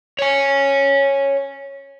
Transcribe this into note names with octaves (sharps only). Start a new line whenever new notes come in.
C#5 G#5